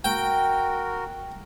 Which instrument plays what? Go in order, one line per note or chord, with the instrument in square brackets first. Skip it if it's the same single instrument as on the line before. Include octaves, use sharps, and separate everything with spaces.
[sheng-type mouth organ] F#4 A#4 [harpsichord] G5